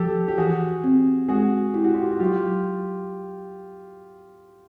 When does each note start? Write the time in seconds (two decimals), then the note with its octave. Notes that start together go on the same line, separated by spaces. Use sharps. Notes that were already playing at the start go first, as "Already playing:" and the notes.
Already playing: F3 G4 A4
0.28 G4
0.38 E3 F#4 G#4
0.84 C4
1.29 G#3 F#4 G#4
1.74 E4 G4
1.84 F#4
1.94 F4 G4
2.12 F#4
2.19 F#3 F4 G4